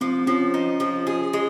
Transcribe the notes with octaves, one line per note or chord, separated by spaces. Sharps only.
F3 C4
F3 C#4
D#4
F3
G#4
G#3